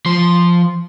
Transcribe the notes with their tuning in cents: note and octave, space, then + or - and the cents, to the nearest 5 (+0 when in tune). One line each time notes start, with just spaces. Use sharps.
F3 -5 C6 +0